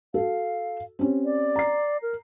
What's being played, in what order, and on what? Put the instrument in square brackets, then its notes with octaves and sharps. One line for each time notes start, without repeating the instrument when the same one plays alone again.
[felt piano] F#4 A4 [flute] F5
[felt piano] C4 C#4 G4
[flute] D5
[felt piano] A#5 C7
[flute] A#4